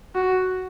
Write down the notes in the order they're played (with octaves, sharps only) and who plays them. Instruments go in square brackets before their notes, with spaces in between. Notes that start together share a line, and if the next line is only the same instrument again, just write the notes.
[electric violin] F#4